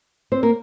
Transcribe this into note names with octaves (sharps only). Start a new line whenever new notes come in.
C4 C5
A#3 A#4